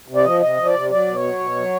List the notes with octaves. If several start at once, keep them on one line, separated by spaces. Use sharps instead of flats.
C3
D5
F3 D#5
C3 D#5
F3
D5
C3
F#3 D5
B2
C#5
F#3
B2
F#3